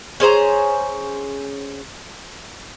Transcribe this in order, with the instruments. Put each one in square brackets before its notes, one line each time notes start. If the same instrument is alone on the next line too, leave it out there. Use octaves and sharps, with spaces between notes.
[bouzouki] C#4 G#4 C5 A#5